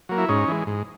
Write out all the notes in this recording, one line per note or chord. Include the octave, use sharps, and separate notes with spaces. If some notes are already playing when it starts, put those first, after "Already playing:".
F#3 A#3
E4
G#2 C#4 D#4
E3 G#3
G#2